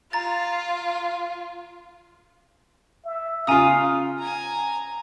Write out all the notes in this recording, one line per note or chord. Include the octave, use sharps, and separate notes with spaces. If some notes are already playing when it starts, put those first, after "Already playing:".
F4 A#5 A6
E5
C#3 F4 F5 G#5 A#5 D#6
G#5 A#5